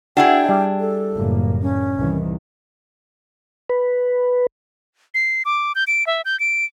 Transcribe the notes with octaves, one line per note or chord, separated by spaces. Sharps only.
D4 E4 F#4 G#4 G5
G3
A4
F#1 A2 A#3
C#4
C2 D#3 E3
B4
C7
D6
G6
D7
E5
G6
D7